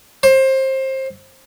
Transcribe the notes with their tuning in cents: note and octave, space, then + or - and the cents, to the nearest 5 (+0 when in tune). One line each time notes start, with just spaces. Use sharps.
C5 +25